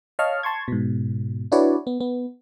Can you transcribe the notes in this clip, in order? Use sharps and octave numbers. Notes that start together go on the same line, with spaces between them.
C#5 D#5 F5 A5 C#6 F6
A5 C6 C#6 G#6
G#2 B2
D4 E4 F#4 B4 C#5 D5
B3
B3